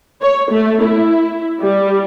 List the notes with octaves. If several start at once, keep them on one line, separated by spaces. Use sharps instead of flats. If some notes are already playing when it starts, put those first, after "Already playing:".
C#5
A3
E4
G3